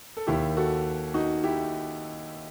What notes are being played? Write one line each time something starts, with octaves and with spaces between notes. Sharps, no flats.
A4
D#2 D#3 E4 G4
F#4 A4
D#4 F#4
E4 G4